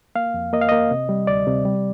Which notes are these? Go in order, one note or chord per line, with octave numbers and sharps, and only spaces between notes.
A#3 F5
F2
A#3 D#5
F5
A#3 D#5
C3
G3
D2 D5
C3
G3